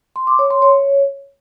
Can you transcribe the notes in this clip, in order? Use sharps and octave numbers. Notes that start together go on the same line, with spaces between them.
C6
D6
C#5
C6
C#5